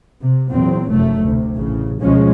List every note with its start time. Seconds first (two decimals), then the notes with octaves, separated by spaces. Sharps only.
0.19 C3
0.51 E2 A#2 F#3 C4
0.91 F1 F#2 A3
1.24 D2 C3
1.57 A1 C#3
2.02 D2 B2 F3 G#3 C#4